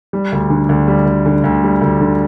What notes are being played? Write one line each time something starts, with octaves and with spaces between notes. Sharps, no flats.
G3
D2
D3
D2
G3
D2
D3
D2
G3
D2
D3